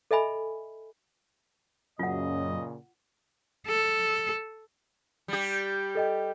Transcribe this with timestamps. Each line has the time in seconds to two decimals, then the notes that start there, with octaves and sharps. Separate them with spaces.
0.11 A4 D#5 E5 G#5 B5
1.99 F#2 A#2 C#3 F4 D#5 F#5
3.67 A4
5.28 G3 G4
5.95 A4 D#5 G5